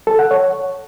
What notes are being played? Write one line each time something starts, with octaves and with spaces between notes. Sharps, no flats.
A4
F#5
C#5